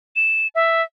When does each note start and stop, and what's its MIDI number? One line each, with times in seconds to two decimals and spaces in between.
0.16 0.48 100
0.55 0.82 76